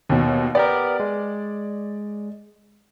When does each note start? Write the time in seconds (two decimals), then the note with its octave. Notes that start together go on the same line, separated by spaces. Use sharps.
0.09 D#2 B2
0.55 B3 G4 A#4 D5
1.00 G#3